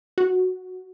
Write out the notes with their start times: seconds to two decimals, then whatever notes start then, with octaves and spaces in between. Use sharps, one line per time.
0.18 F#4